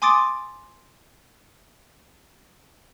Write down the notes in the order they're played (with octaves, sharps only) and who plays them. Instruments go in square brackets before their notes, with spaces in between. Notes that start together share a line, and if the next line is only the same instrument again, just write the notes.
[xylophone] G#5 C6 D6 D#6 A6 D7